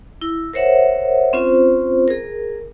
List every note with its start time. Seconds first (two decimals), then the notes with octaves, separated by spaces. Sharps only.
0.21 E4
0.53 A#4 C5 C#5 E5 F#5
1.33 C4 C#4 F4 C5
2.08 G#4 A#4